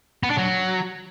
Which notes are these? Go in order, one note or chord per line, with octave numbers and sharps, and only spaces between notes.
B3
D4
F#3